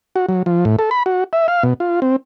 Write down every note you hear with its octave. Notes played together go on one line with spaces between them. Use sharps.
F#4
F#3
F3
A2
A4
B5
F#4
E5
F5
B2
F4
C4